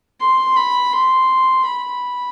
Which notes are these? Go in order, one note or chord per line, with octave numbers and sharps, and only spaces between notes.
C6
B5
C6
B5